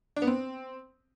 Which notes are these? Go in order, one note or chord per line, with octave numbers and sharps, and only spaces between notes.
D4
B3
C4